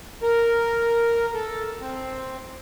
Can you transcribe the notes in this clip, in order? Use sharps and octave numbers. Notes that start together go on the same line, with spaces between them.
A#4
A4
C4